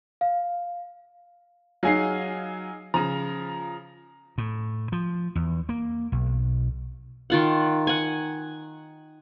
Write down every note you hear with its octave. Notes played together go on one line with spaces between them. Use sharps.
F5
F#3 D#4 G#4 F5 G#5 C7
C#3 F3 A#5
A2
F3
E2
A#3
B1
D#3 F4 F#5
F#5 G#5